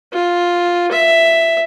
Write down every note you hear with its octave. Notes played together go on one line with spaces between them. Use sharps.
F4
E5